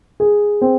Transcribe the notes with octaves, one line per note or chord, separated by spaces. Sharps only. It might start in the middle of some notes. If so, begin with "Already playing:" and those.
G#4
C4